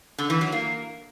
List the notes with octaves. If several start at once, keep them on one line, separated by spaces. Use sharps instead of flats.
D3
E3
F#3
A#3